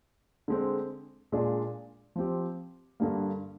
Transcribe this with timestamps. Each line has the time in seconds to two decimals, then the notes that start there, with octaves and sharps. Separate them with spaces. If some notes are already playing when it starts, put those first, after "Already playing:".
0.48 D3 G#3 C4
1.32 A#2 G#3 D4 F4 G#4
2.16 F3 C4 G4
3.00 G2 D3 G3 A#3